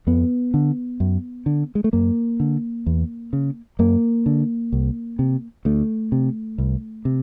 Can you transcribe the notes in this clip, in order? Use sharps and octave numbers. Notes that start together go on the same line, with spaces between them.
F2 B3
D3
F#2
D3
G#3
A3
F#2 A#3
D3
E2
C#3
F#2 A#3
D3
C2
C3
D2 A3
C3
C2
C3